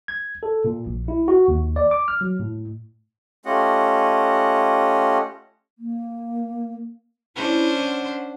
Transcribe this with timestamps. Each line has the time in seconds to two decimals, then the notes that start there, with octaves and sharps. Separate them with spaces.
0.08 G#6
0.43 A4
0.65 A#2
0.87 A#1
1.08 E4
1.28 F#4
1.48 D#2
1.76 D5
1.91 D6
2.08 F6
2.21 F#3
2.40 A2
3.46 A3 C#4 F4 G4 D#5 F#5
5.79 A#3
7.36 C#4 D4 E4 C5
7.76 F#5